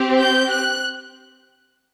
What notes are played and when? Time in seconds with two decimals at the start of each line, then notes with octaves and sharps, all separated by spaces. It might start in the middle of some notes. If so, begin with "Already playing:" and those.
Already playing: C4 G4
0.20 G6
0.52 F#6